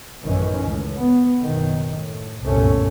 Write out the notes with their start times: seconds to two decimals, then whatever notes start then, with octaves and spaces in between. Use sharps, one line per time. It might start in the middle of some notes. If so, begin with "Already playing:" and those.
0.23 A1 F#2 D#3 E3 C#4
0.66 C#2 A2
0.98 B3
1.42 F#1 B2 D#3
1.97 A2
2.43 G1 C2 F#2 A#2 A3 C#4